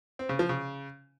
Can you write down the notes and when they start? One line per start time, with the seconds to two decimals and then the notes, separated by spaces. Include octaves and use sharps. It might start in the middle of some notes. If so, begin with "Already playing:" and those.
0.19 C4
0.29 C#3
0.39 F3
0.49 C#3